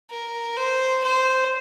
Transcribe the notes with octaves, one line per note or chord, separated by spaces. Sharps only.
A#4
C5
C5